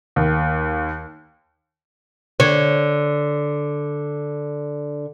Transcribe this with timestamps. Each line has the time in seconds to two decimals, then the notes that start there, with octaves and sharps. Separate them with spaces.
0.16 D#2
2.40 D3 C#5